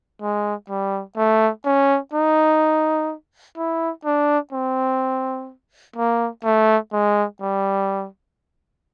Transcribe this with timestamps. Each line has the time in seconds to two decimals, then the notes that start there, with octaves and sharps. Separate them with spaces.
0.21 G#3
0.69 G3
1.17 A3
1.65 C#4
2.13 D#4
3.57 E4
4.05 D4
4.53 C4
5.96 A#3
6.44 A3
6.92 G#3
7.40 G3